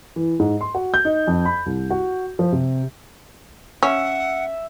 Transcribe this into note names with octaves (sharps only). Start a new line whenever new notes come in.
E3
G#2
C6
F#4
G6
D#4
F2
B5
C2
F#4
F3
C3
C#4 E5 F#5